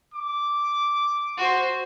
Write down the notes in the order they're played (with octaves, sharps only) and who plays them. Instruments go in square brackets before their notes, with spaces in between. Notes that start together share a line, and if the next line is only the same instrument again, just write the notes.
[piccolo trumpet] D6
[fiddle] F#4 C5